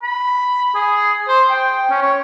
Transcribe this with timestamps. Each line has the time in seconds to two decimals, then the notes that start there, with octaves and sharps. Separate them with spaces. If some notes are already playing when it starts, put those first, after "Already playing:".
0.02 B5
0.75 G#4
1.28 C5
1.50 G5
1.90 C#4
2.01 C#5